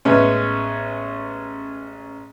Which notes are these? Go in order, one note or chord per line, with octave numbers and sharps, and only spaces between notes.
A1 G#3 B3 C#4